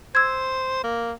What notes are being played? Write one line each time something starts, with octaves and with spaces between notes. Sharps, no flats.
C5 E6 G#6
A#3